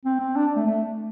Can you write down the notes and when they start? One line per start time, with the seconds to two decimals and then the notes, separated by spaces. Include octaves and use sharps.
0.05 C4
0.20 C4
0.36 D4
0.56 A3
0.66 A3